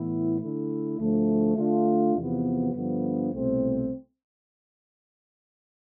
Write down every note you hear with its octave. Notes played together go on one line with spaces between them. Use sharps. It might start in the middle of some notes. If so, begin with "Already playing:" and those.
Already playing: A2 E3 B3 E4
D3 A3 E4
D2 D3 F3 A3
D3 A3 D4 F4
E2 C3 F3 B3
G2 D3 F3 B3
C2 B2 A3 C4